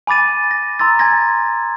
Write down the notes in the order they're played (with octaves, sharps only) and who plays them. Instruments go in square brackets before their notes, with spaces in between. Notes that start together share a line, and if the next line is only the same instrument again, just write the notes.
[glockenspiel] G#5 B5 D6 A6 D#7
A#6
A#5 C6 E6 A6
G#5 G#6 A#6